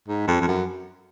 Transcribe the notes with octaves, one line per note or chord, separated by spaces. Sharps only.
G#2
F2
F2
F#2